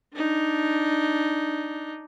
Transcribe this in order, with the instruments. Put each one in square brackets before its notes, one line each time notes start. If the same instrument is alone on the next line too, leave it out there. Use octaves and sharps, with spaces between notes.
[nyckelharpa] D4 D#4